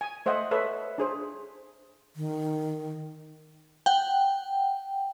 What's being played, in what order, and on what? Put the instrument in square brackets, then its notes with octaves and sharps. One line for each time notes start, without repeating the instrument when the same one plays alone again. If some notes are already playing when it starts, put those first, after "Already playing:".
[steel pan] G#5
A3 C5 D#5 E5 F#5
A4 B4 C#5 E5
D4 G#4 C5
[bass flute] D#3
[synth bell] F#5 G5